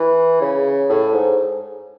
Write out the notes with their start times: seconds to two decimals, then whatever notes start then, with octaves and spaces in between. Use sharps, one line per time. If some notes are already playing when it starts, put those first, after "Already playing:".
Already playing: E3
0.41 C#3
0.90 A2
1.13 G#2